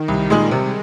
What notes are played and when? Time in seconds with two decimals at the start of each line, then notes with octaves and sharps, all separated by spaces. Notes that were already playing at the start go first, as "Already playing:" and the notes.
Already playing: D#3
0.08 C2 G3
0.30 A#2 G#3 D#4 G#4
0.51 C3 G#3